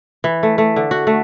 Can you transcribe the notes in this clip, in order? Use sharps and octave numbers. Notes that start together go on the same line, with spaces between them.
E3
A3
A3
D3
F#4
A3